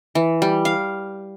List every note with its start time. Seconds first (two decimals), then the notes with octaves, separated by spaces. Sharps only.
0.15 E3
0.42 G3
0.65 F5